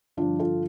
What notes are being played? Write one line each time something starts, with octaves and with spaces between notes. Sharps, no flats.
G2 D3 F3 D4 F4
F4 A4